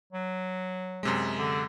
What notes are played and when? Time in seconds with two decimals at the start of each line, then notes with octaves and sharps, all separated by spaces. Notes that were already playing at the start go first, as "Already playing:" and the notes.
0.13 F#3
1.03 F#2 C3 G#3
1.38 D3